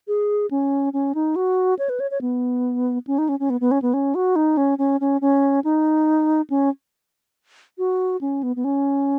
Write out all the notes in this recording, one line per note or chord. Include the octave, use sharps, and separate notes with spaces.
G#4
C#4
C#4
D#4
F#4
C#5
B4
C#5
C#5
B3
C#4
D#4
C#4
C#4
B3
B3
C#4
B3
C#4
F#4
D#4
C#4
C#4
C#4
C#4
D#4
C#4
F#4
C#4
B3
B3
C#4